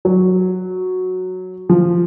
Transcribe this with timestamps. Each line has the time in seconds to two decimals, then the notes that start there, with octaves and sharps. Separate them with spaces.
0.05 F#3
1.69 F3